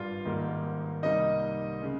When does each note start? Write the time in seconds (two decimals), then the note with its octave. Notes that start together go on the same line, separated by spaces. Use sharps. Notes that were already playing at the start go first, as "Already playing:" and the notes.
Already playing: G#1 G2 G3 F4 F5
0.25 G#1 G#2 D#3 G3 A#3
1.03 C2 C3 G3 A#3 D#4 D#5
1.81 C#3 G#3